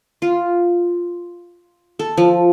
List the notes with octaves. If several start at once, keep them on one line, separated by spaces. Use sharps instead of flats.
F4
A4
F3